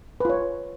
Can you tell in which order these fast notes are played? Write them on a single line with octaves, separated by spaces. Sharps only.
B4 F4 C#5